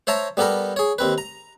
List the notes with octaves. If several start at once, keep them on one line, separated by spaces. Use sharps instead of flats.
C5 C#5 E5 A5 A#5
G3 B3 G4 A4 A#4
G#4 C#5
D#2 C4 B4
A#5